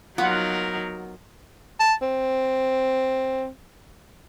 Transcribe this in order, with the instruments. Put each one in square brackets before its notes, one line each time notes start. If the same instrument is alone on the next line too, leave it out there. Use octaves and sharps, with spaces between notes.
[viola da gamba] F#3 D#4 A#4 [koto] B3 [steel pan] F4 F#5
[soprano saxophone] A5
C4